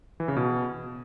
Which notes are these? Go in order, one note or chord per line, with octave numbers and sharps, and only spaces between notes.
E3
C#3
B2